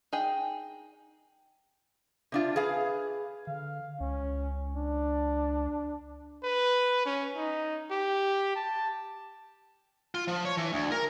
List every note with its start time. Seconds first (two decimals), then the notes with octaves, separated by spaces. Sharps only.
0.13 D#4 G#4 G5
2.32 C3 D4 F4
2.56 G#4 B4 F5
3.47 D3 F5
4.00 C#2 C#4
4.76 D4
6.43 B4
7.05 C#4
7.36 D#4
7.91 G4
8.56 A5
10.14 F4
10.28 F3
10.45 C#5
10.57 E3
10.73 D2
10.92 A#4